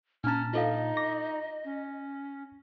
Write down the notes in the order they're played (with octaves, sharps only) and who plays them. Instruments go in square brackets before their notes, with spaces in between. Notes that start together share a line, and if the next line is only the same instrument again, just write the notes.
[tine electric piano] A#2 A5 [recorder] C#4 [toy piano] D4 A#5 [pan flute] F6
[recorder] D#4 [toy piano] F4 A4 F5 [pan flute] D#5
[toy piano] D6 [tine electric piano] A#6
[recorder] C#4